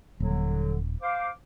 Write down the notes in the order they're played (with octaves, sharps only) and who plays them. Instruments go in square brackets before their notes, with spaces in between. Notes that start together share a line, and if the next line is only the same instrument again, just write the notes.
[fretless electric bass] D#1 [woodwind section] D3 F#3
[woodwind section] C5 F5 D6